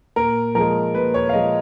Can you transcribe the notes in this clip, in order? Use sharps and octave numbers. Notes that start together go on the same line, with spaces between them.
A#2 A#4
F3 G#3 A#4
A#2 B4
C#5
F5
F3 G#3 D#5